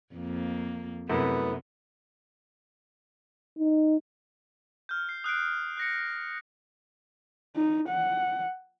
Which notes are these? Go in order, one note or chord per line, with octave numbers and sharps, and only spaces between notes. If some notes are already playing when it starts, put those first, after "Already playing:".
F2 A#3
F#2 C3 A3 B3 E4
D#4
F6 G6
C7
D#6 F#6 C7 D7
F#6 A#6 C#7
D#4
F#5